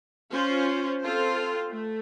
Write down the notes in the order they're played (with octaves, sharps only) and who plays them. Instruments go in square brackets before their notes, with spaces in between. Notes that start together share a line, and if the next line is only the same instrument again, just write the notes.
[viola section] C#4 F4 C5
C4 F4 A4 C5
A3